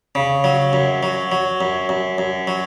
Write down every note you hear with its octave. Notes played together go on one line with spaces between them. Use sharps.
C#3
F#3
F#2
F#3
F#3
F#2
F#2
F#2
F#3